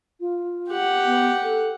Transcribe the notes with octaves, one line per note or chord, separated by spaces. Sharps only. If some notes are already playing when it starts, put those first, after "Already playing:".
F4
G4 F#5
B3
A4